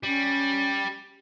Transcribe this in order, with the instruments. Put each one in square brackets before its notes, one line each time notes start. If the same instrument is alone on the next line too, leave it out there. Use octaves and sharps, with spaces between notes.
[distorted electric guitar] G3 [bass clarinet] C#4